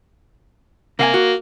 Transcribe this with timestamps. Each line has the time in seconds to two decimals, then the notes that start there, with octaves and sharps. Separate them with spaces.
0.99 C3 A#3 F5 G#5
1.14 F#4